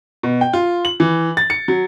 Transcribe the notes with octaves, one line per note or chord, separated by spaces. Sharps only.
B2
G5
F4
F#7
E3
A6
C#7
F#3